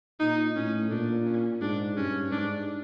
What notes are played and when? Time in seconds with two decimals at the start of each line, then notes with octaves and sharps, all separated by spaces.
0.20 A#2 D#4
0.56 A2 C#4
0.91 A#2 D4
1.26 C#4
1.61 G#2 D4
1.97 G2 C#4
2.32 G#2 D4